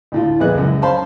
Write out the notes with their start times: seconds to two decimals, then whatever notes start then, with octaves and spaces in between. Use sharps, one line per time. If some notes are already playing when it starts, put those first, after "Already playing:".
0.12 D2 A2 F4
0.40 F2 A#2 B3 E4 G#4 F#6
0.55 C#2 F#2
0.82 C#4 C5 F5 A5 B5 C6